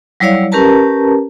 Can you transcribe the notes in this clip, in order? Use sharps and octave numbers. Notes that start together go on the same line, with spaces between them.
F#3 G3 E4 C#5 D5 F5
C#4 G4 A#4 B4 A5 A#5